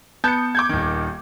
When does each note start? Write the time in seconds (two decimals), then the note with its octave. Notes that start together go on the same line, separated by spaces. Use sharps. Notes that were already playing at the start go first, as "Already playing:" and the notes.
0.24 B3 A5 G6 C#7
0.55 D6 G6 G#6
0.69 D#1 D#3